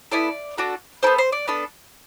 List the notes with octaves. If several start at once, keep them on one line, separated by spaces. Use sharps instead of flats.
B3 E4 A4 D5
D4 F#4 A4
B3 E4 A4 C5
C5
D5
B3 D4 A4